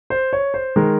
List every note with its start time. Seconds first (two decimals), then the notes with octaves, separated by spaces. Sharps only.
0.10 C5
0.33 C#5
0.54 C5
0.76 D#3 G#3 A#4